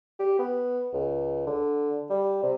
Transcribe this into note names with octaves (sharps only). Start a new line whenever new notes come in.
G4
B3
C#2
D3
G3
C3